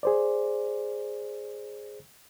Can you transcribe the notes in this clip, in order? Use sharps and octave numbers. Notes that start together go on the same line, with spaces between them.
G#4 C5 D5